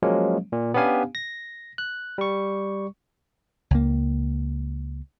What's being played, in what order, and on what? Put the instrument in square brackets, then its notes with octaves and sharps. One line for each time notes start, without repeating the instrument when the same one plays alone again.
[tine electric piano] F3 F#3 G#3 A#3 C#4
A#2
B3 C#4 D4 G4 F5 G#5
A#6
F#6
G3 C#6
[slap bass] C#2 A#3